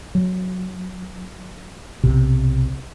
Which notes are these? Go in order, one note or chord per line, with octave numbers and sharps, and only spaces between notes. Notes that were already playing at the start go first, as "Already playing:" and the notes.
F#3
B1 C3